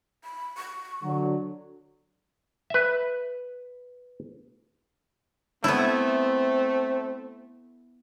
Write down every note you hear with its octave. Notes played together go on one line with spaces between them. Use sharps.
B5
C#6
D3 F#3
B4 E5
A3 B3 C4 E4